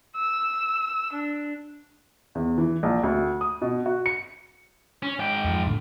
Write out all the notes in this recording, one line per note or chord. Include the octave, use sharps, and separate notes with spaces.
E6
D4
E2
E3
A#1
D2
D#6
B2
F#4
C#7
C#4
G#2 G5
F2 F3
A2 D3 A3